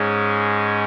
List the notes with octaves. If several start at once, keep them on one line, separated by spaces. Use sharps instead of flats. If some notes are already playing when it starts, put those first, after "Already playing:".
Already playing: G#2 G#3 C#4